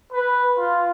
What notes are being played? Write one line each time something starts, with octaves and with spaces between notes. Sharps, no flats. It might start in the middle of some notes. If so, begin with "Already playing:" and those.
B4
F4